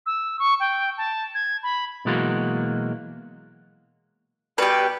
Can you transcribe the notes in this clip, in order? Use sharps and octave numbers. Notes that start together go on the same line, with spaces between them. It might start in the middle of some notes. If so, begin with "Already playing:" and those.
E6
C#6
G5
A5
G#6
B5
B2 E3 F#3 G#3 A#3 F#4
B2 G3 G4 B4